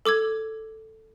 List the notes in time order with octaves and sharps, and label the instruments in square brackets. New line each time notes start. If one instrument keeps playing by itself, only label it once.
[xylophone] A4 D6 E6 G#6